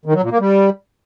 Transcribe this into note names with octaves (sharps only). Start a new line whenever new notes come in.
D#3
F#3
A#2
A#3
G3